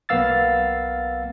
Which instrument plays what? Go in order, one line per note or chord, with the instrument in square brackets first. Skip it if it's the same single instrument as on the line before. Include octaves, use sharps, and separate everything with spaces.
[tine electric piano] B1 A#3 B3 F5 E6 A6